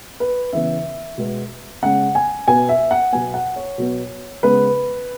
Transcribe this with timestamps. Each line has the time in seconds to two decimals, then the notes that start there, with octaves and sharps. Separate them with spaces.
0.20 B4
0.53 C#3 E3 B3 E5
1.18 B2 G#3 B3
1.82 C#3 G#3 C#4 F#5
2.15 G#5
2.48 B2 B3 G#5
2.69 E5
2.91 F#5
3.12 B2 F#3 B3 G#5
3.34 F#5
3.56 C#5
3.78 B2 F#3 B3
4.43 C#3 G#3 B3 B4